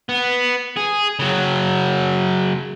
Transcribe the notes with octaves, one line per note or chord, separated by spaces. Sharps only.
B3
G#4
C#3 F#3